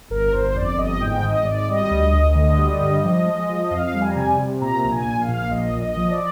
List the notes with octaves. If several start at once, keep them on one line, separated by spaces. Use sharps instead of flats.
G1 A#4
G1 C5
F2 D5
G1 D#5
G#2 G5
G#1 D#5
G#1 D5
G3 D#5
D2
D2
D3
G3
G2
F3
G#3
F3
F2 F5
G3
G#5
A#5
C3 G#5
C3
A#2 A#5
A#1 A#5
G#5
A#1
F5
A#2
A#1 D#5
A#1
D#5
F3
D5